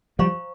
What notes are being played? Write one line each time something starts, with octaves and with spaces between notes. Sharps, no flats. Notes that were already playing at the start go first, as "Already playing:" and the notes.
F3 G3 C5 F5 A#5 C#6